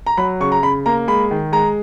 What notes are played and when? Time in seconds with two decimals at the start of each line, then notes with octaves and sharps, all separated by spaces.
0.07 A#5
0.17 F#3 B5
0.40 C#3 C#6
0.52 A#5
0.63 C#3 B5
0.86 A#3 A#5
1.08 G#3 B5
1.31 D#3
1.52 G#3 A#5